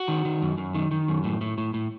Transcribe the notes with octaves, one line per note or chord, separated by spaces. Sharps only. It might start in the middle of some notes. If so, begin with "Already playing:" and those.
Already playing: F#4
D#3
D#3
F#2
F#2
D#3
D#3
F#2
A2
A2
A2
A2